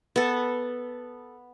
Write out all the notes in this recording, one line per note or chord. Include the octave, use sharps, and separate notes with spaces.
B3 A4